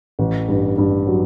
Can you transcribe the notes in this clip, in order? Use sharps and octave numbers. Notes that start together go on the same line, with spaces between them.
A1
G2
G2
F#3